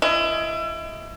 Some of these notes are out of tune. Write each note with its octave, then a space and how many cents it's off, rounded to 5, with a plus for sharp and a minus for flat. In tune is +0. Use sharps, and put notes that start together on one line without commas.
E4 +35 D#5 +40